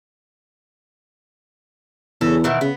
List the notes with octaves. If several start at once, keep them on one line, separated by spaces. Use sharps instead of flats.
E2 C#3 C#4 A4
B2 D#3 E3
C#3 B3